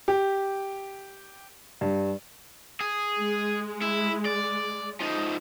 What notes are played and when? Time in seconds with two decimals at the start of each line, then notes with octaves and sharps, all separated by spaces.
0.08 G4
1.81 G2
2.81 G#4
3.18 G#3
3.81 E4
4.25 D5
5.01 F3 D#4